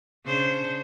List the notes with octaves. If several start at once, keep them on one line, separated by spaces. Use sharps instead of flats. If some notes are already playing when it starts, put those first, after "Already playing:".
C#3 D4 C5